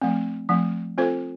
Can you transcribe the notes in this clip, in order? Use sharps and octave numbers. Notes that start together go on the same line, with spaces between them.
F3 A3 C4
F3 A3 C4
C4 F4 A4 C5